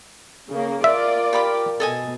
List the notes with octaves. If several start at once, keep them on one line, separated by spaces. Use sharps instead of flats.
C#3 A#3
F4 A#4 D5 E5
G4 B5 D6
B2 A4 D#5 G#5